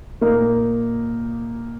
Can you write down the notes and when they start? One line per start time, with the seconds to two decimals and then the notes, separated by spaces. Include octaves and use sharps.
0.21 A#2 A#3 D#4 A#4